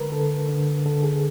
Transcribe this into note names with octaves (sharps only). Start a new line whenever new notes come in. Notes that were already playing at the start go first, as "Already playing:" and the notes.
Already playing: D3 G#3 A#4 B4
D3 A4
D3
D3 A4
G#4